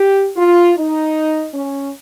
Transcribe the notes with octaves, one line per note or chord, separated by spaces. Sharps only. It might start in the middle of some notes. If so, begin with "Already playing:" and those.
Already playing: G4
F4
D#4
C#4